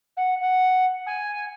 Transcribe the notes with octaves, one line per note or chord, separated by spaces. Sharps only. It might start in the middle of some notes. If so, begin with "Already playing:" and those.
F#5
F#5
G#5